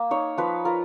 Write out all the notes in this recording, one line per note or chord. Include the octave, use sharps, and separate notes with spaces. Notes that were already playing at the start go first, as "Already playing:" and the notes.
Already playing: A#3
D#4 C#5
F3 B4
F4 A#4